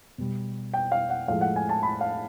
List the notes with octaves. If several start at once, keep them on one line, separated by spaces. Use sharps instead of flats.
B2 G3
G5
F5
F#5
A2 F3 G#3 F5
F#5
G#5
A5
B5
F5